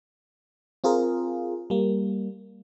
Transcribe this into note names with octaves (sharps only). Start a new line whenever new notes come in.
C4 F4 G#4 A#4
G3 A#3